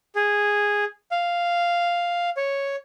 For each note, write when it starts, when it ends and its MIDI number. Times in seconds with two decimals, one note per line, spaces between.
0.15 0.84 68
1.11 2.30 77
2.37 2.76 73